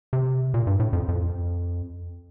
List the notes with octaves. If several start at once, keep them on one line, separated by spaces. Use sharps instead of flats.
C3
A#2
G2
A2
F2
F2